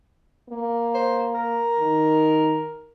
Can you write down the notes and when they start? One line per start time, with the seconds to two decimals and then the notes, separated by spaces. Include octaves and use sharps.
0.50 A#3
0.94 C5
1.35 A#4
1.79 D#3